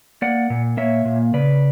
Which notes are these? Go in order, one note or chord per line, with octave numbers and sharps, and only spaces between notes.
A#3 D5 F#5
A#2
A#3 C#5 E5
A#2
C#3 B4 D5